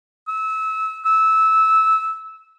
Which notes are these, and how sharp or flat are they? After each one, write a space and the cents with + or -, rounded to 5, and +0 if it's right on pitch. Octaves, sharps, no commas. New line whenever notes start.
E6 -25
E6 -15